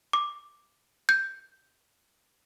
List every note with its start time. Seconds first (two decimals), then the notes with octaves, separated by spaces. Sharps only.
0.13 D6
1.09 G6